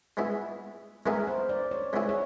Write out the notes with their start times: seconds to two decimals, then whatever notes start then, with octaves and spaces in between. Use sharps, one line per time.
0.17 G#3 B3 E4 G#4
1.06 G#3 B3 E4 G#4 A#4
1.27 C5
1.49 D5
1.71 C#5
1.93 G#3 B3 E4 G#4
2.09 C#5